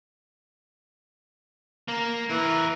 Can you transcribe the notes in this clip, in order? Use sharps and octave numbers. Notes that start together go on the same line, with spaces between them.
A#3 A#4
E3 A#4 B4